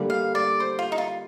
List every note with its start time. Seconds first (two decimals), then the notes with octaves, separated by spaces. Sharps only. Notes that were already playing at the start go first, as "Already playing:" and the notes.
Already playing: D3 G3 A#3
0.10 F5
0.35 D5
0.60 C5
0.79 F4
0.92 D#4
0.98 F4